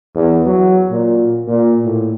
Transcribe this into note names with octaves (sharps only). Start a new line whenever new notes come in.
E2
F#3
A#2
A#2
A2